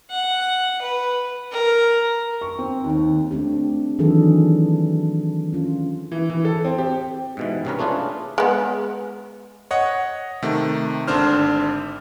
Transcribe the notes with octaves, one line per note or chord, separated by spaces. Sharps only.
F#5
B4
A#4
C#6
C4
D#2
A3 C4 D4 G4
D#3 E3 F#3 D4 G#4 A4
C#4 F4
E3
E3
A4
C4
G4
G#2 B2 E3
C2 G2 C3 C#4 A#4 B4
A3 C#4 D4 F4 G#4 B4
G#3 B3
C#5 D#5 F#5
C3 D#3 A3
G#1 D3 D4 C5 F6